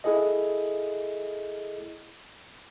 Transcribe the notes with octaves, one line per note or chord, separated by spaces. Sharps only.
E4 G#4 A4 D#5